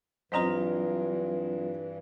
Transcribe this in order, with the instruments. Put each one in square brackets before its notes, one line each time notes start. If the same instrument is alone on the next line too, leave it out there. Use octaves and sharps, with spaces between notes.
[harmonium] G2 E3 [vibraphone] F#3 C4 F4 [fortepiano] C5 D#5 A#5